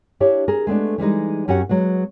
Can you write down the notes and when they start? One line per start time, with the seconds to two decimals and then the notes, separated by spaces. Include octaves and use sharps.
0.20 D4 E4 G4 C#5
0.48 G#4 A#4
0.67 G#3 A3 B3 D4
0.98 E3 G3 G#3 D#4
1.48 F#2 C#4 F#4 G4 F#5
1.69 F#3 G#3 B3